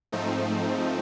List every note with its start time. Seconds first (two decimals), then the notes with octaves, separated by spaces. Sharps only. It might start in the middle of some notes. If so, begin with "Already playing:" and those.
0.12 G#2 F3 A3 C4 D#4